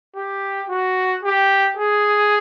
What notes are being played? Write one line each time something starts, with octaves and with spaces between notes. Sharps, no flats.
G4
F#4
G4
G#4